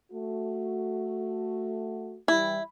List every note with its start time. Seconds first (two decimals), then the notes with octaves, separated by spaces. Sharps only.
0.12 A3 F#4
2.28 E3 G3 E4